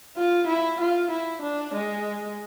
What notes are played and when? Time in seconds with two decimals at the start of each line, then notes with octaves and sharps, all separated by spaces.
0.17 F4
0.48 E4
0.80 F4
1.11 E4
1.42 D4
1.75 G#3